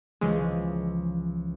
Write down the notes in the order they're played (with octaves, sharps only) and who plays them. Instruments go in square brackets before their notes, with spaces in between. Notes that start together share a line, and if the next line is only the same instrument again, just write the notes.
[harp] C#2 E3 F3 [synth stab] G#3